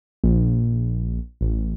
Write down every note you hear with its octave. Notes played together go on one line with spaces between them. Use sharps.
A#1
A1